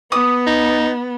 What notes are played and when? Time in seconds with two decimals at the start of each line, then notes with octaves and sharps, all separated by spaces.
0.12 B3 D#6
0.47 D#4